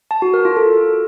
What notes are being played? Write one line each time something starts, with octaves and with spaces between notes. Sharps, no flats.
A5
F#4
A#4
F4
A4